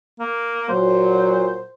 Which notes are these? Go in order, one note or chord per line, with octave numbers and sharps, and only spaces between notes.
A#3
A#2 F#3 C5